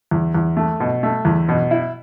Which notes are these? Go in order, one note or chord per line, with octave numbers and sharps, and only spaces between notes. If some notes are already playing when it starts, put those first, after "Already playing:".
E2
E2
A3
B2
A3
E2
B2
E4